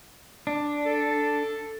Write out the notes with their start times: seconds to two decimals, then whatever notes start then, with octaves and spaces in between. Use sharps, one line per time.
0.47 D4
0.86 A4